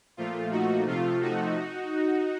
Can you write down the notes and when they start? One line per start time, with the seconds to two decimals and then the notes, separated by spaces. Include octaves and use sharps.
0.17 A#2 F3 A3 F4
0.51 D#4 F#4
0.86 C3 F3 A3 F4
1.21 D#4 F#4